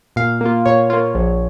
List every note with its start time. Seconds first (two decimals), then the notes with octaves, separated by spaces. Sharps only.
0.16 A#2 F5
0.41 A#3 F4
0.66 A#2 C#5
0.90 A#3 F4
1.15 A#1